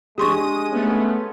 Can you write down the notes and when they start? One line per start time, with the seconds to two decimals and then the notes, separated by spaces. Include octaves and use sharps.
0.18 G#3 D4 G4 G#4 C6 C#6 D#6 D#7
0.71 A3 B3 C#4